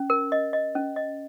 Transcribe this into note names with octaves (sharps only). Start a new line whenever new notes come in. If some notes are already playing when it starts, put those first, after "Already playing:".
Already playing: C#4
A#4
D#5
D#5
C#4
D#5